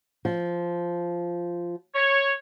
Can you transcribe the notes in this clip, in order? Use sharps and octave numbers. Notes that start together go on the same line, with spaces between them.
F3
C#5